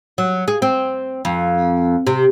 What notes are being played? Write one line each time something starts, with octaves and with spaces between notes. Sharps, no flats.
F#3
G#4
C4
F2
C3